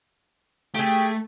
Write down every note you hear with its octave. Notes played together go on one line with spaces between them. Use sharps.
A3 G4 G#4 G5